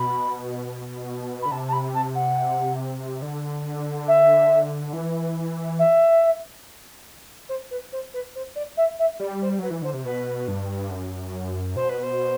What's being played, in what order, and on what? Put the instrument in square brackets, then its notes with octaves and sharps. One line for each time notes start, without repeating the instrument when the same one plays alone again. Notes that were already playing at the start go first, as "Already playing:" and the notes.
Already playing: [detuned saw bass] B2 [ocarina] B5
[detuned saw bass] D3 [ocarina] B5
[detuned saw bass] C3 [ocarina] A5
[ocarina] A5
B5
A5
F#5
[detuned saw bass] D3
[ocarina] E5
[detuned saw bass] E3
[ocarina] E5
C5
B4
C5
B4
C5
D5
E5
E5
[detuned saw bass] G3 [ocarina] D5
[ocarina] C5
[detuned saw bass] F#3 [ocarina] B4
[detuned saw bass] E3
[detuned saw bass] D3 [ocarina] C5
[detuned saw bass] C3
[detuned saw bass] B2 [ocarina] B4
[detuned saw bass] G2
F#2
[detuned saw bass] B2 [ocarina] C5
[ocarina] B4
C5